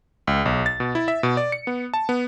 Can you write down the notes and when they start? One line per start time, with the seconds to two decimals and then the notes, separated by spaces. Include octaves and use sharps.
0.27 C#2
0.46 B1
0.66 A6
0.80 B2
0.95 E4
1.08 E5
1.23 B2
1.37 D5
1.52 C#7
1.67 B3
1.94 A5
2.09 B3